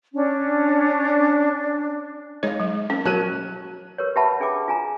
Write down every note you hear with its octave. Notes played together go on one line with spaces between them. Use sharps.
C#4 D4
G#3 D#4 C#5 D5 F5
F#3
F3 A#3 C4 C#4
F#3 A#4 C#5 A5 F#6 D#7
G4 A#4 B4 C#5
G4 B4 E5 F#5 A5 B5
D4 G#4 G5 D6
F4 G#5 A#5